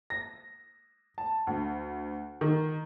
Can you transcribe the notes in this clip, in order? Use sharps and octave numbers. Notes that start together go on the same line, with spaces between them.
A#6
A5
D2
D#3